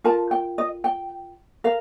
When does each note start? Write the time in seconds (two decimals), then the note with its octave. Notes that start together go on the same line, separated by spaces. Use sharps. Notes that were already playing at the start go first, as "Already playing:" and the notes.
0.04 F4 A#4 A5
0.31 G5
0.58 D#5
0.84 G5
1.64 A#4 F5